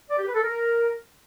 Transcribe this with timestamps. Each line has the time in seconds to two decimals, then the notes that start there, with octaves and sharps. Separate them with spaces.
0.10 D5
0.18 G4
0.26 B4
0.35 A4
0.43 A#4